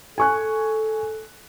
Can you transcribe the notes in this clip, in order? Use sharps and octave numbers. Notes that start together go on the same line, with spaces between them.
A4 G#5 C#6 F#6